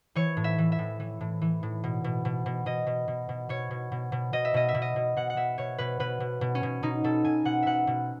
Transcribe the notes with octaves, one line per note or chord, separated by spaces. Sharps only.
E3 C#5
A2
E5
E3
E5
A2
E3
A2
E3
A2
B2
B2
B2
B2
B2 D#5
B2
B2
B2
B2 C#5
B2
B2
B2
B2 D#5
E5
B2 D#5
E5
B2
D#5
B2
B2 F#5
F#5
B2 E5
B2 C#5
B2 B4
B2 B4
B2
B2
C#4
B2
B2 D#4
B2 A4
B2 G#5
B2 F#5
B2 E5 F#5
B2